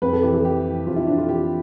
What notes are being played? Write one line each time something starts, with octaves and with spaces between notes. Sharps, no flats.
F2 B4
A4
E3 G4
A4
E3 G4
E3
F2 F4
E4
F2 D4
F4
E3 G4